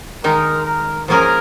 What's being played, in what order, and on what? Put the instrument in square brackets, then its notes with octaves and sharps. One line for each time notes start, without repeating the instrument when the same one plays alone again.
[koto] D#3 G#3 D#4 [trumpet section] A#4
[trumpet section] A#4
[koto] F3 A#3 C#4 G#4 [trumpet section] A#4